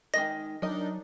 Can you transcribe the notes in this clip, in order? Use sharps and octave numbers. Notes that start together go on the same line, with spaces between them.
D#3 G#3 D#5 A#6
F#3 D4 D#4 A#4 D#5